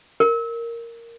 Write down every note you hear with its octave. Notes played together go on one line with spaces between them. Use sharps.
A#4